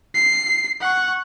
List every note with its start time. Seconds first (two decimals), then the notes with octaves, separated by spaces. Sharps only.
0.14 C7
0.81 F#5 C#6